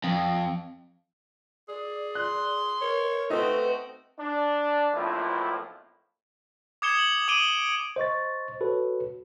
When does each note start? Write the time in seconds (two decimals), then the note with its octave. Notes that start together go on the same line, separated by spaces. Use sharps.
0.04 F2
1.69 G#4 D5
2.15 C6 F#6
2.81 A#4 C#5
3.30 A3 C4 D#4 F#4 B4
4.18 D4
4.94 B1 F2 A2 F3 A#3 E4
6.82 D6 D#6 G#6 C#7 E7 G7
6.98 F#7
7.28 D6 D#6 D7 D#7 G7
7.96 C5 D#5 C#6 A6
8.61 F#4 A4 B4 C#5